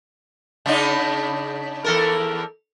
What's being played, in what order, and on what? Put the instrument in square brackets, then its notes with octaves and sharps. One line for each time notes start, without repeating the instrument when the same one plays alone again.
[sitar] C#3 D4 D#4
E2 A4 A#4